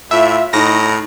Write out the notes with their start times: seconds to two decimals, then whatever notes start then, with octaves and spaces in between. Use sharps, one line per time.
0.11 A2 F4 E5
0.53 A2 D#4 A#6